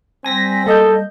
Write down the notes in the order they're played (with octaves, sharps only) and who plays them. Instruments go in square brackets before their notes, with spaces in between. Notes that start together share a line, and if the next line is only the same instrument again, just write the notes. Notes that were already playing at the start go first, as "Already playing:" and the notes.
[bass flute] G3 [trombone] C4 [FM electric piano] G#5 A#6 B6
[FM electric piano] A#3 D#5 G6 [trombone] A4